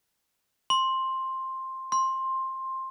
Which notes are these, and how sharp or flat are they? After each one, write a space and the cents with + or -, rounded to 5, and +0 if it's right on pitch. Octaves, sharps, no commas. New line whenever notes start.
C6 +10
C6 +15